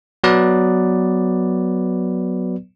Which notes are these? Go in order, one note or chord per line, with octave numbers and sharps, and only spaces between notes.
F#3 B3 B4 D5